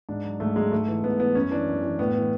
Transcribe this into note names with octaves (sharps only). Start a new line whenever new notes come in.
G#2 D4
F#3
G#2 A3
F#3 G#3
G#2 A3
E3
G#2 B3
E3 B3
F#2 C#4
E3 D4
F#2
E3
A2 B3
E3